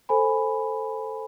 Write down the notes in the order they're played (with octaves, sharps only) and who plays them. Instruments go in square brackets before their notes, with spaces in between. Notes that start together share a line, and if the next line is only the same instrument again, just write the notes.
[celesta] A4 C5 G#5 B5